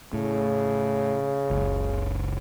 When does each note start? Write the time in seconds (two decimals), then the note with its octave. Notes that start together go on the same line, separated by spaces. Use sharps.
0.13 A2 C#3
1.50 F#1 C#2